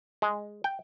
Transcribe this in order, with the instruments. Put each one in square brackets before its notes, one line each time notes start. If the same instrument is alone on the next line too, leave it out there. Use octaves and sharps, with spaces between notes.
[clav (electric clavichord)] G#3
G5